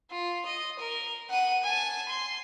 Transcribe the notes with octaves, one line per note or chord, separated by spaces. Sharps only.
F4
D#5
A#4
F#5 D#7
G#5 A5
C6